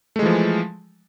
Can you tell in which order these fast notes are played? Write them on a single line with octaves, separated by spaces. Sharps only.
A3 G#3 E3 F3